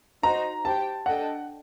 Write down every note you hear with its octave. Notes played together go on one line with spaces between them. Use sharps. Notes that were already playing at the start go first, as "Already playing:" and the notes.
D#4 F#4 C5 A#5
G4 C5 G5 A5
D4 A4 D#5 F#5 G5